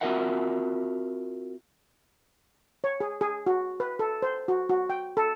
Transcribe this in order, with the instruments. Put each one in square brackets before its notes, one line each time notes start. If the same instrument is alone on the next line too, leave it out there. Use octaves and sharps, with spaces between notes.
[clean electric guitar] C4 F4 F#4 A#4 E5 F#5
[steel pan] C#5
G#4
G#4
F#4
B4
A4
C5
F#4
F#4
G5
A4